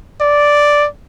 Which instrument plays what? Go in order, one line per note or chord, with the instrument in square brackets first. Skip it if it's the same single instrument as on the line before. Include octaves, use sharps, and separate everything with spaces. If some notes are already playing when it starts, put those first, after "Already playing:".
[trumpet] D5